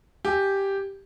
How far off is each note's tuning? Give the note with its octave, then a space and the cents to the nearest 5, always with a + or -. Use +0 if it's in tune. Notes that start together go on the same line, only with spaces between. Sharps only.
G4 +0 G#5 +0